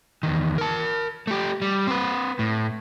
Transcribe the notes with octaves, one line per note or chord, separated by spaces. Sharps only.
E2 D#3
A#4 A5
A3 G4
G3
C4 B4
A2